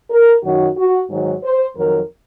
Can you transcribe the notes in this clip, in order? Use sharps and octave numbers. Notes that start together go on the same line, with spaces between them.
A#4
F#2 D#3 F#3 F#4
F#4
G#2 D#3 F#3
C5
F2 D#3 F#3 A#4